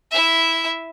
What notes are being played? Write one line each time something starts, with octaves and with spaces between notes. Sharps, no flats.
E4 E5